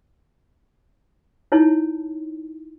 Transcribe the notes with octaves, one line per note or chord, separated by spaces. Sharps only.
D#4 E4 C#5 A5